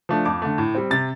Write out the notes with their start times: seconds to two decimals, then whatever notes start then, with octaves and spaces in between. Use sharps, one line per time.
0.09 F3 A3 D4
0.25 F2 D6
0.42 D3 A3
0.58 A2
0.75 G3 C4
0.91 C3 A6